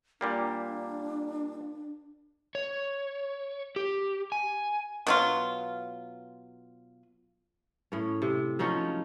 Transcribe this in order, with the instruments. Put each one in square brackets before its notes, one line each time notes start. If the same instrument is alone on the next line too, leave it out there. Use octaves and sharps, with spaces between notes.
[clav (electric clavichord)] A#2 G3 A#3 [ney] D4
[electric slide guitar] C#5
G4
G#5
[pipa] B2 F#3 F4
[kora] A2 C#4
C3
F3 F#3 C#4 D#4